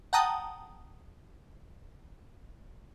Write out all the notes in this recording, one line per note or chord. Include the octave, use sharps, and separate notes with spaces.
F#5 G5 A5 A#5 D#6